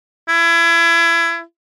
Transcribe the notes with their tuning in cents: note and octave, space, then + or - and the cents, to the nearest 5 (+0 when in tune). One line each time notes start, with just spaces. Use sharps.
E4 +30